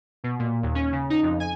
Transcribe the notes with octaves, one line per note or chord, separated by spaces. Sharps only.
B2
A#2
D#2
C#4
C#3
D#4
F2
G#5